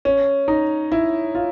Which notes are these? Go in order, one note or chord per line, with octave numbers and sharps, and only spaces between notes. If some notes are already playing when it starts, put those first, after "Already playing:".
C#4
D#4
E4
F4